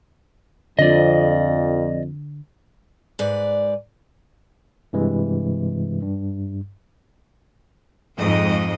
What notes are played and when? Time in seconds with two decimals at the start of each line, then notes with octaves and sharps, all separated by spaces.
0.79 F2 D3 D5 D#5
3.19 G#2 B4 D5
4.93 G2 C3 E3 G#3
6.02 G2
8.17 F2 G#2 D#5